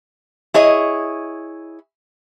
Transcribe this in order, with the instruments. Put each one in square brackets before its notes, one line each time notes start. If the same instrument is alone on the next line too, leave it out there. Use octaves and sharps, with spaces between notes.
[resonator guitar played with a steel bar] E4 G#4 C#5 D#5